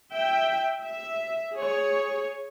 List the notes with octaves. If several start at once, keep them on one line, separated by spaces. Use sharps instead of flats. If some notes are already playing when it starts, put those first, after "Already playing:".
E5 G5
E5
G#4 C#5